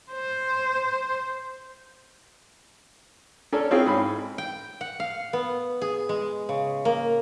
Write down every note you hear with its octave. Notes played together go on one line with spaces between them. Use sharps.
C5
C#4 D4 A4 A#4 C#5 D5
C4 C#4 E4 F4 G#4
G#2 B5
G5
F#5
F5
B3
G#4
G#3
C#3
A#3